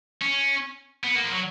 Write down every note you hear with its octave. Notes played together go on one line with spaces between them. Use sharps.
C#4
B3
A#3
F3
F#3